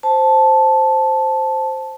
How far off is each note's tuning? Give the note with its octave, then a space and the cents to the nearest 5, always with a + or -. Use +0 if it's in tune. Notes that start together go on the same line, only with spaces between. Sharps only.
C5 +0 A5 -5